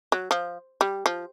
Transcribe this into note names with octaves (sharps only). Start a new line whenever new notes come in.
F#3
F3
G3
F3